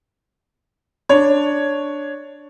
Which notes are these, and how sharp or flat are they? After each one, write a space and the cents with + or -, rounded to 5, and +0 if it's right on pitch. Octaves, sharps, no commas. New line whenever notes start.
D4 +0 C#5 +0